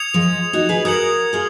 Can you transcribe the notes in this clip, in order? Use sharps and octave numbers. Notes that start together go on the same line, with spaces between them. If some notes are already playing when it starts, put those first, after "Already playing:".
Already playing: D#6 G#6 C#7 F7
F3 G#3
D#4 F#4
G#4 B4
F#4 A#4 D#6 G#6 C#7 F#7
F4 G#4